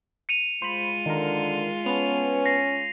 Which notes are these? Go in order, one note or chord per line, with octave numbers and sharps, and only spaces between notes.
C#7 D#7 F7
G#3 F4 C5 B5
D3 D#3 A#4
B3 C#4 B4 A5 F7
A#6 C7